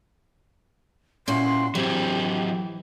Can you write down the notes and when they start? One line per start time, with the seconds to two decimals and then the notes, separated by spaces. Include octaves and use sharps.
1.28 A#2 C#4 E4 F#4 C6
1.75 E3 F#3 C4 G4 G5